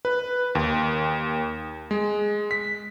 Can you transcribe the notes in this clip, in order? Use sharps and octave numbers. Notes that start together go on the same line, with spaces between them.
B4
D#2
G#3
B6